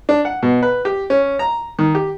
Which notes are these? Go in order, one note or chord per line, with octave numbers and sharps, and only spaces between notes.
D4
F#5
B2
B4
G4
C#4
A#5
D#3
G4